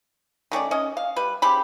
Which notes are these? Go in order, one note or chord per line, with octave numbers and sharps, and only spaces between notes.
D#3 A3 C#4 D5
C#4 D#5
F5
G3 B4
C#3 C4 G4 B5